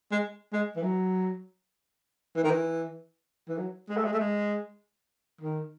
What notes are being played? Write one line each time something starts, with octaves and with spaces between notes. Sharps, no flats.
G#3
G#3
E3
F#3
E3
D#3
E3
E3
F#3
G#3
A3
G#3
A3
G#3
D#3